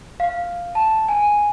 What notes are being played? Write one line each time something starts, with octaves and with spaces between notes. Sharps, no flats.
F5
A5
G#5